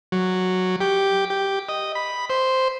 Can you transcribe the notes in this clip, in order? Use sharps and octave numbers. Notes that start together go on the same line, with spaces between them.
F#3
G4
G4
D#5
B5
C5